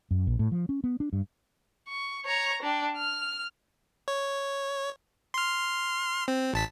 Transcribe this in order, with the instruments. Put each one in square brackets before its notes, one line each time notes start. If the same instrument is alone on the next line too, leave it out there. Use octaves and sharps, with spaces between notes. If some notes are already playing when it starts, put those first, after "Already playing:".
[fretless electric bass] F#2
A#1
A2
F3
C#4
B3
D4
G2
[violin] C#6
C#5 A#5
D4 G5
F6
[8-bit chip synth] C#5
C6 F6
C4
A1 A5 B6